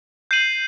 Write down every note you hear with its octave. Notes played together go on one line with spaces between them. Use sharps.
G6 C7 D#7 F#7